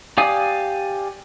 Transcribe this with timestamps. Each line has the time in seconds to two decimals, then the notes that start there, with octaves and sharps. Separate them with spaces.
0.18 G4 D5 F5 G#5 D#6